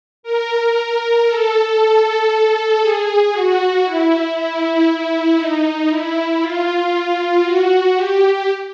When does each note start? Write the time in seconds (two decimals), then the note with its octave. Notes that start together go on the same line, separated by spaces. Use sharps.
0.23 A#4
1.27 A4
2.80 G#4
3.32 F#4
3.84 E4
4.35 E4
5.37 D#4
5.89 E4
6.41 F4
7.44 F#4
7.95 G4